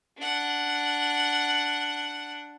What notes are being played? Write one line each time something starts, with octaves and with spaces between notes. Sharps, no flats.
D4 F#5